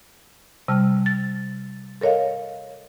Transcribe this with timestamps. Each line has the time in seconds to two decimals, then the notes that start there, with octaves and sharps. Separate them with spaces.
0.68 C3 G3 A5 F6
1.06 A6
2.01 A4 A#4 C#5 D#5 F5